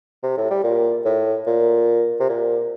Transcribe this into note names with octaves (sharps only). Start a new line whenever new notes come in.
C3
A2
G3
A#2
A2
A#2
C3
A#2